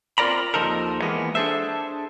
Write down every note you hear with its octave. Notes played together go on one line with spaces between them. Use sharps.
C4 F4 A#4 D5 A#5 B5
D#2 F3 D#4 A4 A#4
E3 G#3 A#3 B3
D4 G#4 A4 C5 E5